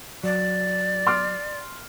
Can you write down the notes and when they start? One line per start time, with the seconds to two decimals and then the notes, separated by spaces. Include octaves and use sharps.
0.24 F#3 D5
1.07 C6 D6 F6